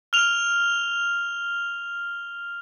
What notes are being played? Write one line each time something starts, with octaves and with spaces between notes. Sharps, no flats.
F6 F7 G7